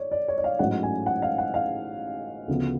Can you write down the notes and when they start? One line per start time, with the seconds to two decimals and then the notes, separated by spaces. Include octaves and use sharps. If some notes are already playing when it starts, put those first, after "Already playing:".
Already playing: C#5 D5
0.12 D5
0.28 C#5
0.38 D5
0.44 F5
0.59 A1 G#2 F#3 A3 C#4 F#5
0.83 G#5
1.06 F#5
1.22 F5
1.38 F#5
1.54 F5
2.48 D2 C#3 F3 B3